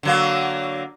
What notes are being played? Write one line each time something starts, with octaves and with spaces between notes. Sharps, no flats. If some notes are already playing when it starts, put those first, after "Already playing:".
D3 F#3 A#3